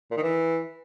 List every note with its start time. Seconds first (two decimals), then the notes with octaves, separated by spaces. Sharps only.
0.11 A#2
0.17 D#3
0.22 E3